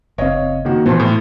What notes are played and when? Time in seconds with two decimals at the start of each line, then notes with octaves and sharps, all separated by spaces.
0.18 F#1 C4 C#5 D#5 F5
0.65 D#3 A#3 F#4
0.86 A#2 E3 F3 B3 C5 A5 C6
1.00 A2